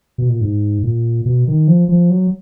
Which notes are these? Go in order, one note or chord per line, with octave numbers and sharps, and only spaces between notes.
B2
A#2
G#2
A#2
B2
D#3
F3
F3
F#3